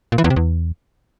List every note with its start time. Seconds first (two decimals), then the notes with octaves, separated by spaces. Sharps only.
0.12 A#2
0.18 E3
0.24 E2
0.30 C3
0.36 E2